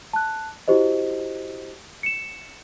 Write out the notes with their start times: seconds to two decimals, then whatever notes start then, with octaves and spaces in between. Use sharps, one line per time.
0.13 A5 F#6
0.68 E4 F#4 G4 C5 D#5
2.03 C#7 E7